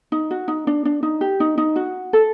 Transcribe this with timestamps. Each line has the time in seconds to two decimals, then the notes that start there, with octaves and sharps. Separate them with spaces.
0.12 D#4
0.31 F#4
0.48 D#4
0.67 D4
0.85 D4
1.03 D#4
1.21 G4
1.40 D#4
1.58 D#4
1.76 F#4
2.13 A4